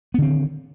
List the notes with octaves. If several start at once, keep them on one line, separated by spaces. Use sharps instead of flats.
D3 D#3 B3 C4